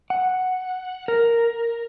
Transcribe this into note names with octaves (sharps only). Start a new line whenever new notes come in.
F#5
A#4